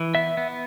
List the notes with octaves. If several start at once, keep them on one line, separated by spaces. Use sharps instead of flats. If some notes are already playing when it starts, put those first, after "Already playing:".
Already playing: E3
B3 E5
B3